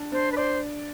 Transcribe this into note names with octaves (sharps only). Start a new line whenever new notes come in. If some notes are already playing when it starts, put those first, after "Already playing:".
Already playing: D4
D4 C5
B4
C5 D5